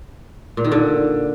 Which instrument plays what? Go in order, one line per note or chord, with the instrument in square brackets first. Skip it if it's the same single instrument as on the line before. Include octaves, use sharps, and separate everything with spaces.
[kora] A#2
D#3
D3